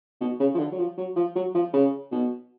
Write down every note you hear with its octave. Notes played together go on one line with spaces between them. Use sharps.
B2
C#3
F3
D3
F#3
F3
F#3
F3
F#3
F3
C#3
B2